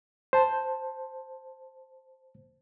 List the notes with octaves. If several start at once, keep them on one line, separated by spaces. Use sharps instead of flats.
C5 A5